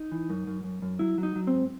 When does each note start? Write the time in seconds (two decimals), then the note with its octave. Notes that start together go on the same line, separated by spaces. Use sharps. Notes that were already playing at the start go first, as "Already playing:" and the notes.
Already playing: D#4
0.12 E3
0.30 F#2
0.47 F#2
0.64 F#2
0.82 F#2
0.99 F#3 E4
1.18 F#3
1.23 D#4
1.35 F#3
1.47 C4
1.53 G#2